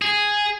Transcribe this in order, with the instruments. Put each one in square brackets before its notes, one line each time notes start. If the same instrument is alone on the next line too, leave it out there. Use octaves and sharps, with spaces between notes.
[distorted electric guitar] G#4